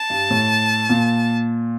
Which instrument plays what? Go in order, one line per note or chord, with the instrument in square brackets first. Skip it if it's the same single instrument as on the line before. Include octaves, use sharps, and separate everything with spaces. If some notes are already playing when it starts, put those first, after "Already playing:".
Already playing: [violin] A5
[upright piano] G2
A2
A#2